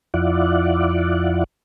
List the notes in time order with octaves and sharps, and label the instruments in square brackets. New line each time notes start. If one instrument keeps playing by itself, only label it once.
[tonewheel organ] F2 E4 F4 D5 F#5